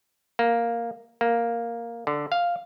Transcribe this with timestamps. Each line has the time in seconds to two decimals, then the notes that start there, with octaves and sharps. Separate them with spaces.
0.39 A#3
1.21 A#3
2.07 D3
2.32 F5